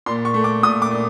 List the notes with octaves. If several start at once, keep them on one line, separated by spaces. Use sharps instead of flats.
A#2 C6
C#6
A3
D6
A#2 D#6
D6
A#2